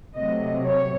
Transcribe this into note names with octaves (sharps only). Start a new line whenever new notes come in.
C3 F#3 A3 D#5
C#5